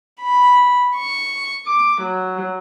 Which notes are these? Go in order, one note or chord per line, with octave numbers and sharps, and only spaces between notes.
B5
C#6
D6
F#3